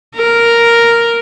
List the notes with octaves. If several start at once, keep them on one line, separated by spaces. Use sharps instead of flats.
A#4